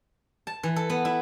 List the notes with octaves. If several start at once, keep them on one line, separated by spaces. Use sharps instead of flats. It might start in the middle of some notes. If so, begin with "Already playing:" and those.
A5
E3
A4
B3
E4